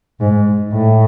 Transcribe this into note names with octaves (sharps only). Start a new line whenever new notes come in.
G#2
A2